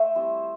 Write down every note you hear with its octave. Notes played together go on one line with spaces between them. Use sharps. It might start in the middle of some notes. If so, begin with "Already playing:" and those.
Already playing: A3 C5 E5
G3 C4 E4